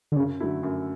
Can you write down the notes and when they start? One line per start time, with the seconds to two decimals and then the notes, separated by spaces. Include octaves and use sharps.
0.12 D3
0.16 F#2 C#3
0.40 D3 F#3 A3 E4
0.63 F#2